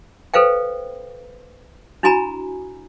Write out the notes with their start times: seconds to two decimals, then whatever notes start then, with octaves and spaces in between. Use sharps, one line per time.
0.34 A4 B4 C5 F5 G5
2.03 D4 E4 F#4 G#5 A#5 B5